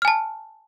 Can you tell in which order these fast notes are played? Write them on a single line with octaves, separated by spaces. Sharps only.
F6 G#5 A5